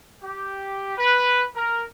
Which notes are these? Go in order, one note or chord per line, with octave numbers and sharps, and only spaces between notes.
G4
B4
A#4